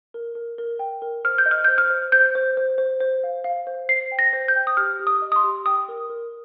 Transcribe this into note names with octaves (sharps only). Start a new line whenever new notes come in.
A#4
A#4
A#4
G5
A#4
C5 F6
G6
D#5
F6
C5 G6
F6
C5
C5 G6
C5
C5
C5
C5
F5
F5
C5
C5 C7
G5
A#6
C5
G6
G5
D#6
G4 F6
G4
D#6
D#5
D#6
C6
G4
G5 D#6
A#4
A#4